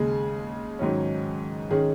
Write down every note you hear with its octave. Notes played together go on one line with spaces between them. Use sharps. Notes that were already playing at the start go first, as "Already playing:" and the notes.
Already playing: D#2 C#3 G#3 G#4
G#2 D#3 F#3 C#4
D#3 G#3 C#4 G#4